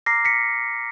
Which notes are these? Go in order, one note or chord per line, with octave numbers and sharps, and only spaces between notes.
A#5 D6 F6 A#6 C7
B6 C#7